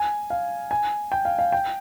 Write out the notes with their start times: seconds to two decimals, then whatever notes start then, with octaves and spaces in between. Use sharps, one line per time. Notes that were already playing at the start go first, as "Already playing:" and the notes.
Already playing: G#5
0.30 F5
0.71 G#5
1.12 G5
1.25 F5
1.39 F5
1.52 G5